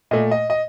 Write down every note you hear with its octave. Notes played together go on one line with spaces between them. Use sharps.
A#2 A3 D#5
D#5
D#5